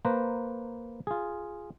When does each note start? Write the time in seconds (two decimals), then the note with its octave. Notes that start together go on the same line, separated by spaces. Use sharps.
0.05 A#3 B4 C5 A#5
1.07 F4 G#4